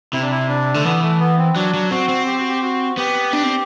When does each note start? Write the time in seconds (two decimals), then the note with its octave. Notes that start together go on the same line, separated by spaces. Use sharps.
0.13 C3 E4
0.22 D4
0.31 E4
0.49 D4
0.74 D3 A3
0.84 E3 B3
1.03 A3
1.20 B3
1.38 C4
1.55 F#3 D4
1.74 F#3
1.91 C4 F#4
2.09 C4
2.26 G4
2.38 F#4
2.48 G4
2.62 F#4
2.97 B3 G4
3.33 D4
3.44 C4